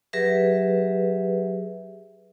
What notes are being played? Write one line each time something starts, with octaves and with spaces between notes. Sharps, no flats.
F#3 G4 G#4 B4 E5